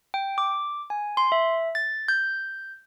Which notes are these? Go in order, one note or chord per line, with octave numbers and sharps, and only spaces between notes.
G5
D6
G#5
C6
E5
A6
G6